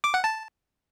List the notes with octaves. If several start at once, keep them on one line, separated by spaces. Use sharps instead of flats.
D6
F#5
A5